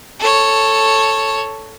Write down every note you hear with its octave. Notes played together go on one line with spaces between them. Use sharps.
A4 C#5